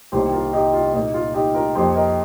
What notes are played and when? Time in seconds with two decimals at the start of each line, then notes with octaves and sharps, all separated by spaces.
0.12 C2 C3 D#3 A#3 G4 C5
0.33 F4 A#4
0.53 D#4 G4
0.73 F4
0.93 A#2 A#3 D#4
1.14 F4
1.34 D#4 G4
1.55 F4 A#4
1.75 F2 F3 A#3 G4 C5
1.95 A#4 D#5